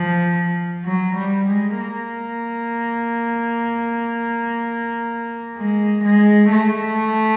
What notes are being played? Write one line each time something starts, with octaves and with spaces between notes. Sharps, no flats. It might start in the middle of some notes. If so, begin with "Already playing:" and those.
Already playing: F3
F#3
G3
G#3
A#3
G#3
G#3
A3